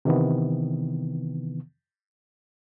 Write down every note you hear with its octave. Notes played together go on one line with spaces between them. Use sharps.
C3 D#3 E3 B3